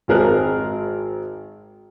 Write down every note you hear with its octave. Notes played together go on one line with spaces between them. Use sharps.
G#1 C4 G#4 A#4 A5 F#6